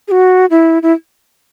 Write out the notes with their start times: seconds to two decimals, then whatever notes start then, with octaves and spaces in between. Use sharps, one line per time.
0.08 G#4
0.11 F#4
0.50 E4
0.83 E4